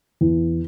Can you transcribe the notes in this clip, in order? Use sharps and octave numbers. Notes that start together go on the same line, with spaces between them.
E2